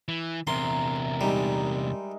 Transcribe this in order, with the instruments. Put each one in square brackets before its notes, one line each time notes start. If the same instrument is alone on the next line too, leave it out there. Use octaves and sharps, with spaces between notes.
[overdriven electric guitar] E3
[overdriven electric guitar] E2 C3 [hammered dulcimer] A#4 E5 [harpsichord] C6
[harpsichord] G3 [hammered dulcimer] G#3 D#4 E5